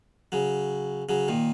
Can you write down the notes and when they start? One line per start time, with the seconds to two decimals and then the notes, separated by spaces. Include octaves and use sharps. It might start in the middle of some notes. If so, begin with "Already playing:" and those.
0.32 C#3 F#3
1.09 C#3 F#3
1.28 A#2 D#3